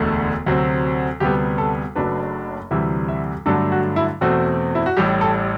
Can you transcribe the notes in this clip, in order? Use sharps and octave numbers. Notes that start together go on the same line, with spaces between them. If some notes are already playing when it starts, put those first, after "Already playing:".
Already playing: E1 D2 D3 A3
D2 C3 F#3 C4
D2 C3 G3 B3 G4
A4
F#1 F#2 F#3 A3 D4 B4
D2 C3 E3 G3 E5
E5
G2 D3 F#3 A3 D4 A4
F#4
E4
E2 B2 A3 C4 F#4
E4
F#4
A1 A2 G3 G4
A4